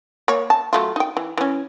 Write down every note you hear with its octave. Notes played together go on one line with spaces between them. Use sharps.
A#3 C#5
A5
F#3 A3 F4
D#4 G5
E3
E3 C#4